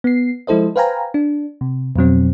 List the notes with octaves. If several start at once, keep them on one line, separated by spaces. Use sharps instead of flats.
B3 C7
F3 G#3 E4 A4 C5 D#5
B4 C5 F5 G5 G#5 A#5
D4
C3
F2 B2 F#3 C4